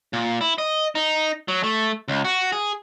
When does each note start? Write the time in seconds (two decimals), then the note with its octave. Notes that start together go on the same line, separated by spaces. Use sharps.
0.13 A#2
0.41 E4
0.58 D#5
0.95 D#4
1.48 F#3
1.63 A3
2.08 C#2
2.25 F#4
2.52 G#4